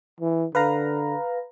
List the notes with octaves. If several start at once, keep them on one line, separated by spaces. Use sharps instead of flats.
E3
D3 B4 F5 A#5